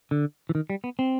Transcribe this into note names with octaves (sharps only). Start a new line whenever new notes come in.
D3
E3
D#3
G3
B3
C4